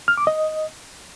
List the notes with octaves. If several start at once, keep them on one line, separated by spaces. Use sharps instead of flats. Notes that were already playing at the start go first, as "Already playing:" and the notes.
F6
D6
D#5